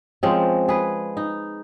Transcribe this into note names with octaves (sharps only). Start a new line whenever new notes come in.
F3 G#3 C4 C#4
G#4 B4
D#4